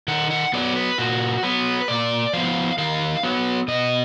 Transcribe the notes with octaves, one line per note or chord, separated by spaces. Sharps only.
D#3 F#5
F#5
F#3 B3 D5
B4
A#2 F#4
F#3 B3 B4
A#2 D5
F3 B3 F5
D#3 F5
F#3 B3
B2 D#5